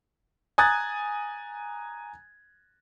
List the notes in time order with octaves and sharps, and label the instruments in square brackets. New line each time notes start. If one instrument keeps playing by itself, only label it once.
[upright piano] G#5 A#5 D#6 F#6 G#6 A6